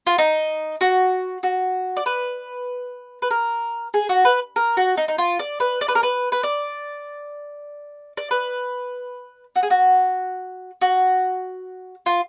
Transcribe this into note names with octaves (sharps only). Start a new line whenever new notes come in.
F4
D#4
F#4
F#4
D5
B4
B4
A#4
G#4
F#4
B4
A#4
F#4
D#4
D#4
F4
D5
B4
D5
B4
A#4
B4
B4
D5
D5
B4
F#4
G#4
F#4
F#4
F4